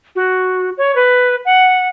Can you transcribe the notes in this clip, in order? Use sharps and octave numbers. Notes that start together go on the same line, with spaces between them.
F#4
C#5
B4
F#5